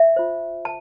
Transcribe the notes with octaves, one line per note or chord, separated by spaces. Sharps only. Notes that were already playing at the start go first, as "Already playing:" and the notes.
Already playing: E5
F4 C5
A5